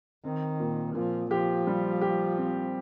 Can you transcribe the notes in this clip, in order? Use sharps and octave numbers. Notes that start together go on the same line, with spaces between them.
D#3 C4
A#2
A#2 F3
F3 G4
G3
G4
C4